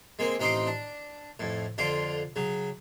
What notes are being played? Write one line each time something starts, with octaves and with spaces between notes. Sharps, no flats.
G#3 A#3 C4
A1 C4 D#4 C5 C6 D6
D4
F2 A2
F2 D3 F4 C6 D6
C#3 F#3